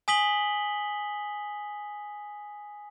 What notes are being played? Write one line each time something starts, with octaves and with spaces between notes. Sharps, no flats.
G#5 D#6 B6 F#7 G7